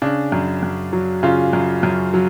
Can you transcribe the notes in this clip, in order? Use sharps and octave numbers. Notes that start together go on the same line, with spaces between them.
C#3 D4
F#2
F#2
F#3
C#3 F4
F#2
F#2
F#3